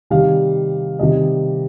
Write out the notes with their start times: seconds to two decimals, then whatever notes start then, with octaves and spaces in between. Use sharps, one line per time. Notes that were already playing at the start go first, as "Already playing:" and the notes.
0.10 C3 D#3 G3 F5
0.99 C3 D#3 G3 D#5